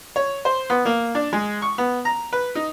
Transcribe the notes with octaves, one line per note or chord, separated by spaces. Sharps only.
C#5
C5
B3
A#3
D4
G#3
C#6
B3
A#5
B4
D#4